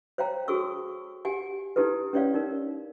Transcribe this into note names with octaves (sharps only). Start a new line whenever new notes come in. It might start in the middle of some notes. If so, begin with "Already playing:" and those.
C5 C#5 F5 G5 A#5
F#4 G#4 A4 C#6 E6
G4 F#5 G#5
D#4 E4 G4 A4 B4
C#4 G4 C#5 D5 F5
D#4 A#4